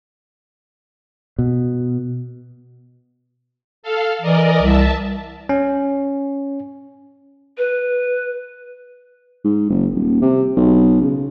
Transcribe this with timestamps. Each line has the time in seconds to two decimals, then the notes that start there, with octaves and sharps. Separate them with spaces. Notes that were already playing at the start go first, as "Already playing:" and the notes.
1.39 B2
3.83 A4 F5
4.22 E3 A#4 D5 D#5
4.62 C2 E5 A5
5.49 C#4
7.58 B4
9.45 G#2
9.70 F#1
9.95 D#1
10.22 C3
10.56 B1
11.01 C#3